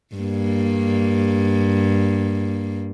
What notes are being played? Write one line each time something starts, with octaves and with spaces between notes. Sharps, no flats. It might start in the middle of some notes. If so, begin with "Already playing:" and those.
G2 A#3